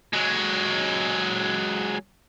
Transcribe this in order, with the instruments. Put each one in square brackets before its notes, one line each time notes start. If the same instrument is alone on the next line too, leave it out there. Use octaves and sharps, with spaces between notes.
[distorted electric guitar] F#3 G#3